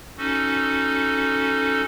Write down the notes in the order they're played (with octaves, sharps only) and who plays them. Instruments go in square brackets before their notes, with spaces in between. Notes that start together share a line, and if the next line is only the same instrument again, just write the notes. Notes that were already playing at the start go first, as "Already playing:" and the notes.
[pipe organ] C#4 D#4 F#4 A4